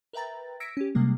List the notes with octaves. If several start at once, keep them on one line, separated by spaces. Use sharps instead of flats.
A#4 B4 E5 G5 A#5 A6
E6 G#6 A#6 B6 C#7 D7
C#4 G4
C3 G3 G#3 A#3